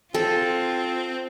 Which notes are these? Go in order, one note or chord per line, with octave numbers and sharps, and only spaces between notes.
C4 F4 A4